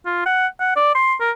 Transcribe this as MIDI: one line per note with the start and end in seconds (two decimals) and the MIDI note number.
0.06 0.23 65
0.26 0.47 78
0.60 0.76 78
0.76 0.94 74
0.95 1.14 84
1.21 1.31 70